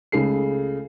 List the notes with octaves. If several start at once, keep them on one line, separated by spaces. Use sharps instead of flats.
C#2 C#3 A3 G#4 A4 C7